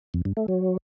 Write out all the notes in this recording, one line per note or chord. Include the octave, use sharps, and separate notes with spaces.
F2
G2
A3
F#3